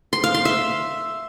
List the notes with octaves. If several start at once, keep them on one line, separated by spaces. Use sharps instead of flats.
C6
F5
C6
E5